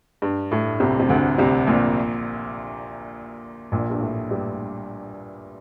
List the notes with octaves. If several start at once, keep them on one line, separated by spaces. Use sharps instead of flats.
G2
A2
C2 C3
C3
D2 D3
C2 C3
A#1 A#2
A#1 A#2
G2
A2
G2 G3